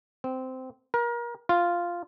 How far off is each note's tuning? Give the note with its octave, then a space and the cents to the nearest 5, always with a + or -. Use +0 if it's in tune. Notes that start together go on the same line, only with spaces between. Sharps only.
C4 -15
A#4 +30
F4 -5